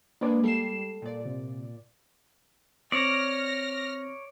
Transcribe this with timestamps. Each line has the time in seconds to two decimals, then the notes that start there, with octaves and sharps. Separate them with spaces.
0.21 G#3 A#3 D4 B4 D5
0.44 G3 A4 C7 E7
1.02 A#2 D5
1.25 C3
2.92 C4 C#5 D5 F6 A#6